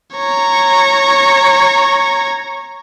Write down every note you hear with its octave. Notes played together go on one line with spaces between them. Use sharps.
C#5 A#5